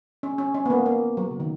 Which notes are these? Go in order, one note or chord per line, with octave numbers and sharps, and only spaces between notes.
C#4
C#4
C#4
B3
A#3
A#3
F#3
C#3
D#3